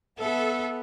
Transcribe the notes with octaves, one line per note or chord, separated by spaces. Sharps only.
B3 A4 E5